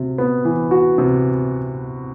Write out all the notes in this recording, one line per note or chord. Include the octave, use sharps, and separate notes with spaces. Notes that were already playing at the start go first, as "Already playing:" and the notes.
Already playing: C3 F#4
B3
E3
F#4
C3